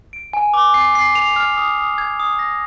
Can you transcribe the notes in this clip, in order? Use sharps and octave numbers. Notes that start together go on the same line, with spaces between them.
D7
G#5
D6
C7
C7
F7
F6
D#6
D#6
G#6
D#6
A#6